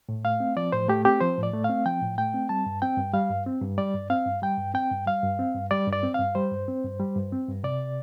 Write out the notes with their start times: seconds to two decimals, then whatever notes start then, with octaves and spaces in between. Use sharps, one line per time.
0.09 A2
0.24 A3 F5
0.40 C4
0.57 F3 D5
0.72 A2 C5
0.88 A3 G4
1.05 C4 G4
1.20 F3 C5
1.38 A2
1.43 D5
1.53 A3
1.64 C4 F5
1.85 F3 G5
2.02 A2
2.18 A3 G5
2.34 C4
2.49 G3 A5
2.66 G2
2.82 C4 G5
2.97 G2
3.14 G3 F5
3.30 G2
3.46 C4
3.62 G2
3.78 G3 D5
3.94 G2
4.10 C4 F5
4.26 G2
4.42 G3 G5
4.58 G2
4.74 C4 G5
4.91 G2
5.06 G3 F5
5.23 G2
5.39 C4
5.55 G2
5.71 G3 D5
5.88 G2 D5
6.03 C4
6.14 G2 F5
6.35 G3 C5
6.51 G2
6.68 C4
6.84 G2
7.00 G3
7.16 G2
7.32 C4
7.48 G2
7.64 C3 D5